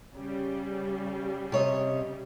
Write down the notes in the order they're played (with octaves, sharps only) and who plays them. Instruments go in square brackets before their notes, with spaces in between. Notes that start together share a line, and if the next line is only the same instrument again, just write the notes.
[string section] C#3 G3
[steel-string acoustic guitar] C3 C#5 D#5